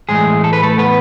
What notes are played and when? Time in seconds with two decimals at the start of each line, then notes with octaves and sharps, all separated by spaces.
0.09 A2 E3 G#3 A3 G#4
0.44 A4
0.53 B4
0.63 A3 A4
0.78 B3 B4